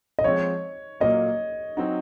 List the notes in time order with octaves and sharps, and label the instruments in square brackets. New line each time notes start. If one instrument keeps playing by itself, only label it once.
[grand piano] D#5
[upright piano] F3 G#3 C4 [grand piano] C#5
[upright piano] A#2 F#3 A#3 [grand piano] D#5
[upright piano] F#3 C4 D#4 F#4